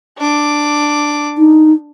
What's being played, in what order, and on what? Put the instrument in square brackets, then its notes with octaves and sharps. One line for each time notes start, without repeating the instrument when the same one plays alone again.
[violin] D4 D6
[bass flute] D#4